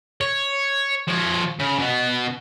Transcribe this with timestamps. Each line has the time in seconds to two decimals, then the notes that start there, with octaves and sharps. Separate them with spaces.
0.21 C#5
1.08 F3 C#5
1.59 C#3
1.78 B2 B3